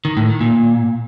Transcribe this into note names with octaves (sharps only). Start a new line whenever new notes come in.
D#3
A2
D#3
A#2